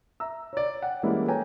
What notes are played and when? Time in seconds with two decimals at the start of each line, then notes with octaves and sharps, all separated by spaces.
0.20 E5 A#5 E6
0.53 C#5 D5
0.82 F#5 G5
1.03 E3 G3 G#3 A#3 C#4 E4
1.28 A4 B4 C#5 G5 G#5 A#5